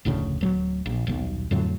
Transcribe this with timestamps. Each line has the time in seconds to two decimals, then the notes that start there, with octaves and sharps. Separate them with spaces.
0.05 F1 D2 A2 C#3
0.41 D1 F#3
0.86 A#1
1.07 D#1 B1
1.51 F2 A2 D3 F#3